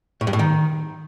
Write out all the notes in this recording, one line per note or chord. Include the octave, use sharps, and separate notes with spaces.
A2
G2
A2
D#3